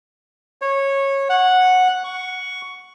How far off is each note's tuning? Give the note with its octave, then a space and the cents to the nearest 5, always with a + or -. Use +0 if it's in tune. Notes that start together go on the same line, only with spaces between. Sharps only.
C#5 -15
F#5 -10
C#6 +10